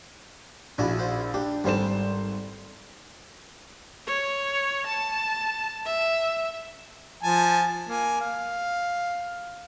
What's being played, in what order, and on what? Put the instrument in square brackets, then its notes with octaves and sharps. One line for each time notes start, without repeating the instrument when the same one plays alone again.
[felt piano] A#1 E4 [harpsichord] D4 F#4 G#5
[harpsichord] F#4 C5
[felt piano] D4 [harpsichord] G4
[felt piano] G#1 C5 E7 [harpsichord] G3 C#4 A4
[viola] C#5
A5
E5
[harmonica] F3 G#5 A5
A#3 G#5
F5